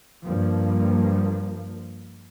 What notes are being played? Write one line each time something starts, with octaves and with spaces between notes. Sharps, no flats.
G2 F3 A#3